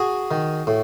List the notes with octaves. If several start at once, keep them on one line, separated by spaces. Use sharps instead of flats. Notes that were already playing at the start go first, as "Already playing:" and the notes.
Already playing: F#4 G#4
D#3
A2